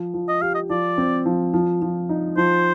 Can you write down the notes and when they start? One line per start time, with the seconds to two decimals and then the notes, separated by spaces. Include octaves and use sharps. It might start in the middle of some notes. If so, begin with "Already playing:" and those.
Already playing: F3
0.14 F3
0.28 D#5
0.41 G4 F5
0.54 D#5
0.69 F3 D5
0.98 C4
1.26 F3
1.54 F3
1.82 F3
2.09 D#4
2.37 F3 C5